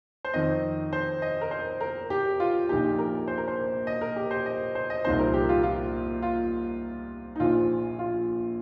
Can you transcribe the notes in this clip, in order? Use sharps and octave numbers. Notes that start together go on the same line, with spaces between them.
C5
F2 D#3 C4 D#4 D#5
C5
D#5
A#4
C5
A#4
G4
F4
A#1 A#2 A#3 D#4 G4
A#4
C5
A#4
C5
D#5
A#4
G4
C5
D#5
C5
D#5
C2 A#2 F3 C4 D#4 C5
A#4
G4
F4
F4
F4
D#4
A#1 A#2 F3 F4
F4